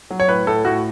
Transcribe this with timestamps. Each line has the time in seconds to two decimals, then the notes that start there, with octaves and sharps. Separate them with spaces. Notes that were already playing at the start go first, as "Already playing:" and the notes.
0.11 F#3
0.20 C#5
0.28 A2 B4
0.47 A2 A4
0.65 A2 F#4